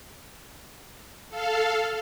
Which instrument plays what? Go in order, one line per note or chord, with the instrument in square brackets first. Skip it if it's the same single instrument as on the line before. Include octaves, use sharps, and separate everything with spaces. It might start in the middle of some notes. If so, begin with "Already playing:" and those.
[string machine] A4 F5